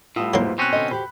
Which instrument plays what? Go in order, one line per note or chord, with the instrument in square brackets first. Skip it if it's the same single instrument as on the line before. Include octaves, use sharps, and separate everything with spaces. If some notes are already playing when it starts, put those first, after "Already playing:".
[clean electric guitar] A2 [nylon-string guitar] G3 B3 F4 [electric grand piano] D#6 E6
[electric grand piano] G#2 E4 C5 [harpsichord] F#3 A#3
[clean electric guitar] B2 C4 C#4 [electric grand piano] C6 F#6
[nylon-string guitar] D3 D#5
[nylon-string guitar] F#4 G4 C5 [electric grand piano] B5